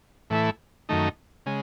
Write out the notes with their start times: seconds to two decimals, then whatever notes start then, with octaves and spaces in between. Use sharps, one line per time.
0.30 A2 E3 A3 E4
0.89 F#2 D#3 A3 D#4
1.46 C#3 G#3